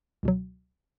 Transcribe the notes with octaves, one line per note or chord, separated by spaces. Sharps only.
C#2 B2 F#3